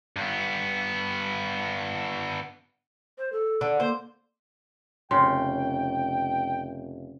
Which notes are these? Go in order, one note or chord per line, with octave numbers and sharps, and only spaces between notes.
G2 B3
C5
A4
D3
A#3 C5
F1 C#3 G5 C6